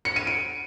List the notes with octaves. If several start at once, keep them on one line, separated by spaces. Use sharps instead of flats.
C#7
D#7
D7